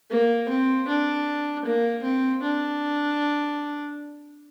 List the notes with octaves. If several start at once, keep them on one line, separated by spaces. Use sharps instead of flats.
A#3
C4
D4
A#3
C4
D4